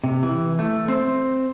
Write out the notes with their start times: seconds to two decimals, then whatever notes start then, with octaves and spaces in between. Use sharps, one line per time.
0.04 C3
0.23 E3
0.59 A3
0.88 C4